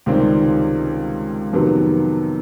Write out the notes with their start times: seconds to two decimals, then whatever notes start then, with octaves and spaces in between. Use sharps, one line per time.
0.06 C#2 C3 D#3 G3 C4
1.53 F2 C3 D#3 F#3 B3